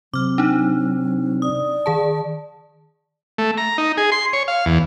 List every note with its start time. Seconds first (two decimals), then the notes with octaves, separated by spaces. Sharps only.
0.14 C3 F#3 D6 F6
0.38 D4 D#4
1.42 D5 D#6
1.86 D#3 G#4 A5
3.38 A3
3.58 A#5
3.78 D#4
3.97 G#4
4.12 C6
4.33 C#5
4.48 F5
4.66 E2